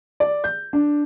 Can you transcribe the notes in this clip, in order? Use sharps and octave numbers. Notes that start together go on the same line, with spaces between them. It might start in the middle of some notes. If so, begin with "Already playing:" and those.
D5
G6
D4